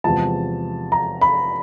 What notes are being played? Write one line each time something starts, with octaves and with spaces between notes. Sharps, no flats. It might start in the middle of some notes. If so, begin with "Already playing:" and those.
E2 C3 F3 G#3 A5
A#5
B5